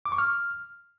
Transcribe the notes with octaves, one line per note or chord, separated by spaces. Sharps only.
D6
C#6
F6